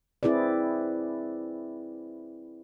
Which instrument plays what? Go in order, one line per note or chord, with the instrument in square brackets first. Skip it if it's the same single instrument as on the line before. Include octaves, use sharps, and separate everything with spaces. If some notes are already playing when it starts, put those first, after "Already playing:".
[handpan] C4 E4 G#4 B4 D5